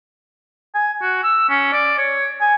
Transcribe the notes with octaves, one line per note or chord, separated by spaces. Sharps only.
G#5
F#4
E6
C#4
D5
C#5
G#5